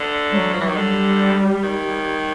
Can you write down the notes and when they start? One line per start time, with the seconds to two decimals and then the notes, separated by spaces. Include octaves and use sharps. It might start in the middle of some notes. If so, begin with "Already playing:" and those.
Already playing: D3
0.32 F#3
0.53 F3
0.61 E3
0.68 D#3
0.76 D3 G3
1.63 D#3